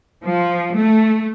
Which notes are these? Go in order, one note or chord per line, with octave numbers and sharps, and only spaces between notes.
F3
A3